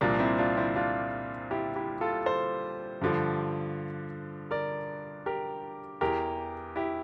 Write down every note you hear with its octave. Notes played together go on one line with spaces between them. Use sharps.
C2 A#2 F3 A#3 D4
C4 E4
D4 F4
C4 E4
D4 F4
E4 G4
E4 G4
F4 A4
A4 C5
G2 D3 F3
A#4 D5
G4 A#4
E2 E3 G4 A#4
E4 G4